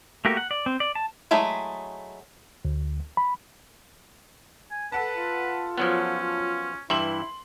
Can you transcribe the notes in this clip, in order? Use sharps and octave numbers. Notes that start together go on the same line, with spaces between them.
A3 A#3 F#4 G4 A#4
F#5
D5
C4
D5
A5
F#3 G#3 A3 E4 G#4
D2
B5
G#5
A4 B4 F#5 A5
F4
F3 F#3 B3 C#4
G2 E3 E4 E5 C6 F#7